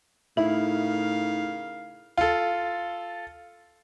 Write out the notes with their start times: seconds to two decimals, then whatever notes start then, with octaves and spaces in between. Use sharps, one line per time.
0.37 A2 C#3 D#4 E4 A#4 F5
2.18 F4 A4